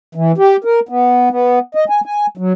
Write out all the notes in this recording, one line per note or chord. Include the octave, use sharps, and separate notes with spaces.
E3
G4
A#4
B3
B3
D#5
G#5
G#5
F#3